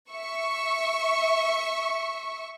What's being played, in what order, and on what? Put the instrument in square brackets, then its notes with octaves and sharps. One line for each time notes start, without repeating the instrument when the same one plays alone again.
[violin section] E5 C#6